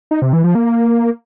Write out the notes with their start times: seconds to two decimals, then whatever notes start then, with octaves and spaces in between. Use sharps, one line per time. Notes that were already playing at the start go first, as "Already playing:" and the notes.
0.11 D#4
0.22 C3
0.33 E3
0.44 F3
0.55 A#3